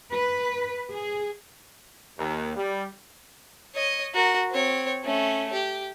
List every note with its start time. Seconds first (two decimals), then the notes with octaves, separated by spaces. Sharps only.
0.12 B4
0.91 G#4
2.18 D#2
2.56 G3
3.75 C#5 D#5
4.15 F#4 A#4
4.51 C4 C#5
5.04 A3 C#4
5.53 G4